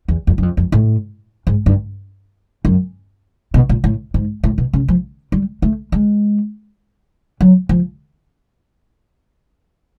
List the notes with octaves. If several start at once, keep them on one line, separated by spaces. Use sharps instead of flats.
E2
F2
F#2
F2
F2
A2
G#2
G2
F#2
B2
A#2
A2
G#2
A2
B2
C#3
F3
G3
A3
G#3
F#3
F3